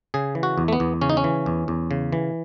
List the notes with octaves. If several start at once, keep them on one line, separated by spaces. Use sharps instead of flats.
C#3 G#4
E3
F#4
E2
A3
B3
E2
C#3 C#4
D#4
C#4
E3
E2
E2
C#3
E3